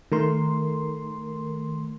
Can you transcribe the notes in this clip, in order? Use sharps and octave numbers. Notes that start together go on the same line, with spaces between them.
D#3 A3 A#4 C6